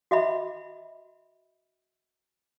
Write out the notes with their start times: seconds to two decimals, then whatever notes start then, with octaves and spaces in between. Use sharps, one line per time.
0.11 F#4 D#5 E5 B5